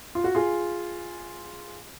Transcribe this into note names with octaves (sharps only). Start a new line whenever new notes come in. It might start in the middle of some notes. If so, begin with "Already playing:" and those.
F4
F#4
F4 G#4